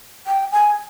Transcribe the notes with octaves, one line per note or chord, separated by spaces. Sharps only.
G5
G#5